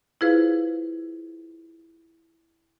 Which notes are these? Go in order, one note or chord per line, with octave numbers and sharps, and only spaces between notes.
E4 F4 G#4 B4 C5 F5